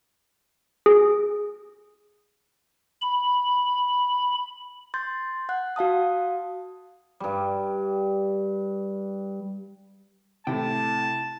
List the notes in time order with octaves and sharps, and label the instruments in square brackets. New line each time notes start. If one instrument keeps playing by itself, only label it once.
[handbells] G#4
[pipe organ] B5
[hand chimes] C6 G6 A6
F#5 F#6
F#4 F5 A5 D#6
[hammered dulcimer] G2 G3
[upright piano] A2 C3 [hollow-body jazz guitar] E4 G5 [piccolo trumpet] A5